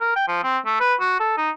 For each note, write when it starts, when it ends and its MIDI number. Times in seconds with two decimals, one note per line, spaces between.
0.01 0.13 70
0.16 0.27 79
0.28 0.43 53
0.43 0.58 60
0.66 0.76 57
0.80 0.94 71
1.00 1.18 66
1.20 1.34 69
1.37 1.50 63